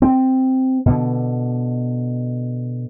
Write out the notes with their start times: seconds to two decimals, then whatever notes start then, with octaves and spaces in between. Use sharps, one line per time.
0.02 C4
0.86 B2 D3